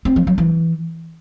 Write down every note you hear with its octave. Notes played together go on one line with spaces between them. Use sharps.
C4
F3
F#3
E3